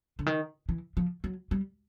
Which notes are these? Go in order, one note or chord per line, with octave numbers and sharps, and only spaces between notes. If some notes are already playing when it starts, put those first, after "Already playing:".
D3
D#3
E3
F3
F#3
G3